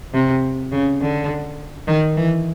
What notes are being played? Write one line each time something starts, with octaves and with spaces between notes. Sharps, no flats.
C3
C#3
D3
D#3
E3